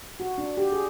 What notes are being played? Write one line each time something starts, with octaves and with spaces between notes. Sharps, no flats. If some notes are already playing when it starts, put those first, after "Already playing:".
F#4
D4
G4
G#4